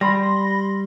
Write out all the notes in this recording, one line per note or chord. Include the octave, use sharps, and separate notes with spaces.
G3 B5 C6 A#6